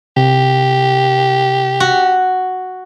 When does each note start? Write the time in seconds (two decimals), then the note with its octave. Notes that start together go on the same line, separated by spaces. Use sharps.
0.17 C3 G4
1.80 F#4